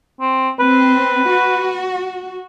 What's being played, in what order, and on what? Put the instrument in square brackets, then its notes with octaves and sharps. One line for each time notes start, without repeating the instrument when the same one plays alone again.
[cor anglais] C4
[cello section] C4 [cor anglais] B4
[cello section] F#4